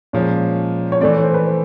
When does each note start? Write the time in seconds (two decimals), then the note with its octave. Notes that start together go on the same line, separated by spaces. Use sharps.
0.13 A#2 F3 G#3 C#4 C#5
0.92 C#5
1.01 E3 A3 C4 D5
1.17 C#5
1.23 C5
1.34 B4
1.45 C5